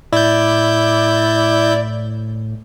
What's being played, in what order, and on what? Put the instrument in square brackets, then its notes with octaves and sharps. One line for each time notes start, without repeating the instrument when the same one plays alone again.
[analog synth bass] A2 [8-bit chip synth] E4 G6 [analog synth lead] D5